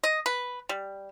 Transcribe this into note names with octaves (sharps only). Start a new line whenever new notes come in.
D#5
B4
G3